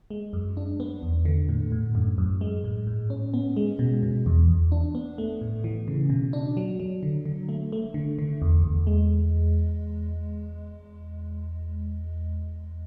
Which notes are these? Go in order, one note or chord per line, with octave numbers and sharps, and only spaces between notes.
G#3
F#2
D4
B3
E2
D3
A2
A2
F#2
F#2
G#3
A2
G#2
C#4
B3
G#3
B2
B2
E2
E2
D4
B3
A3
A2
E3
C#3
B2
D4
F#3
F#3
D3
D3
A3
A3
D3
D3
E2
E2
G#3